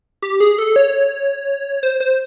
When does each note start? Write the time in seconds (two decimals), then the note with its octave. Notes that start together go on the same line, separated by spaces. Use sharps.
0.22 G4
0.40 G#4
0.59 A4
0.76 C#5
1.83 C5
2.00 C5